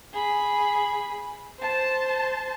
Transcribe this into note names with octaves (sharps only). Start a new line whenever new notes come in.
G#4 B5
C5 A5